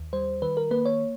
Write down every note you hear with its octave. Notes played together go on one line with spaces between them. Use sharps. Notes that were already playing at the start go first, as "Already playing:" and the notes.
Already playing: D#2
G3 C5
D#3 B4
A#4
A#3 B4
C#5